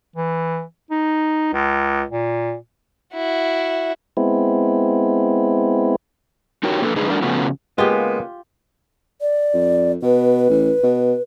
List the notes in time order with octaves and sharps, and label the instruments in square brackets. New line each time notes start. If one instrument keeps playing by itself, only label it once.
[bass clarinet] E3
D#4
C#2
A#2
[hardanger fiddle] E4 F#4
[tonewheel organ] G#3 B3 C4 E4
[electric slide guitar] D#4 F#4 G4 A#4 C#5
A3 A#3 D4 G4 A4 B4
D3 G#3 D#4 G#4 B4
G3 A3 D4 F#4 A#4 D5
C#3 F3 A3 B3 C#4 F#4
[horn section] C#3 A#3 B3 [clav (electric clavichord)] G#3 [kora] F4 G4
[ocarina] D5
[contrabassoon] F2
[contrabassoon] B2 [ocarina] B4
[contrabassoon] A1
B2